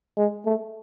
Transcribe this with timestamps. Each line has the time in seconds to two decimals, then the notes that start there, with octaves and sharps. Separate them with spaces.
0.17 G#3
0.46 A3